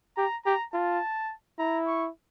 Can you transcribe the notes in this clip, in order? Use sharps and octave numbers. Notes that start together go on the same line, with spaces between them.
G4 A#5
G4 A#5
F4 A5
E4 A#5
C#6